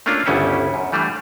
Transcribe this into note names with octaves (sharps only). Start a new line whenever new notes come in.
A3 A#3 C#4 D4 F4
G1 D2 C#3 G3 C#4 E4
F#2
E3 G3 A3 D4